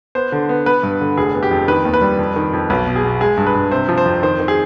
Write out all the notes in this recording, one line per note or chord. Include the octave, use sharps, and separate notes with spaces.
B3 C5
D3
B3
B3 B4
G2
D3
F1 G#4
B3
G4
F2
D#3 B4
D#2
B4
G3
F2
D#3
F2
B1 B4
B2
G#4
B2
G#3 G#4
G2
B4
G2
C3 C5
F3
C5
F2
D#3 C5
D#3
G#4